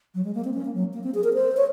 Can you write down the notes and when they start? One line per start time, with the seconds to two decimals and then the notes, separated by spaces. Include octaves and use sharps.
0.15 F#3
0.24 G#3
0.35 A#3
0.44 C4
0.54 C#4
0.65 A#3
0.74 F#3
0.93 A#3
1.04 C4
1.14 G#4
1.24 A#4
1.34 C5
1.57 C#5